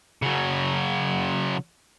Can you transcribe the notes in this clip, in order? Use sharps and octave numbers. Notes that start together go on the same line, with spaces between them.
C#3 F#3